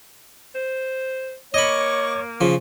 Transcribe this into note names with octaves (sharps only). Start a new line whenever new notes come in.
C5
A#3 C#5 D#5 B5 C#6 D6
C#3 F3